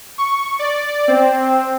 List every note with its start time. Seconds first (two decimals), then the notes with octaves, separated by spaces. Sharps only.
0.18 C#6
0.59 D5
1.08 C4